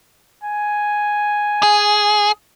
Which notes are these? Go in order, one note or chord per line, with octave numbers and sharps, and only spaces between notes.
G#5
G#4